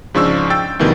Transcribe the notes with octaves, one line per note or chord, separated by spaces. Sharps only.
G#2 C#3 F3 D4 C#6 E6
G5 E6 A6
D2 B2 D#3 E3 G3